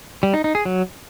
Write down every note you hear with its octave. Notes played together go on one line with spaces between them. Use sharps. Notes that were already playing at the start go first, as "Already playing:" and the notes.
G3
D#4
D#4
G#4
F#3